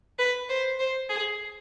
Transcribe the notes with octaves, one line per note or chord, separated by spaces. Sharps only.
B4
C5
C5
G#4